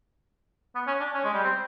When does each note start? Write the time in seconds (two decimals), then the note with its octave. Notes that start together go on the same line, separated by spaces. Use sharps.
0.75 B3
0.87 C#4
1.00 D4
1.14 C#4
1.24 G#3
1.34 G3
1.44 C4